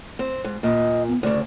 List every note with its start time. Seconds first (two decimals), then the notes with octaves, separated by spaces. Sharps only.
0.19 C4
0.44 G#2
0.63 A#2 D#5
1.09 B3
1.23 D2 C#3 D5